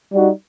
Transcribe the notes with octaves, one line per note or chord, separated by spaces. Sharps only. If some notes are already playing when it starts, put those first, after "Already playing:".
G3 D#4 F#4